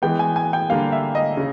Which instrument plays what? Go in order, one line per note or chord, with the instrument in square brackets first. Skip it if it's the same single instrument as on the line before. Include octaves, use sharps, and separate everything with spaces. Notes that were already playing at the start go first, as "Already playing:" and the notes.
[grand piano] E3 G#3 B3 [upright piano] G5
[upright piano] G#5
G#5
G5
[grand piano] D3 G3 A#3 [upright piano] F5
[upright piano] E5
D#5
[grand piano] C#3